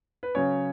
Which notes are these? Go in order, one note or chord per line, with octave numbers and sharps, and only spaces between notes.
B4
C#3 F#3 C#4 C#5